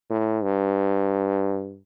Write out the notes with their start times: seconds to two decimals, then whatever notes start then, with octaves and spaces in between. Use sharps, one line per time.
0.10 A2
0.43 G2